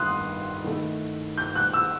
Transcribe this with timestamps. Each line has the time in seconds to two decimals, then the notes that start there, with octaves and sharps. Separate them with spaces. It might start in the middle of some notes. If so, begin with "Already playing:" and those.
Already playing: G2 D#3 A3 D#4 C6 D#6 F#6
0.64 D#3 A3 E4
1.38 G6
1.55 F#6
1.74 E6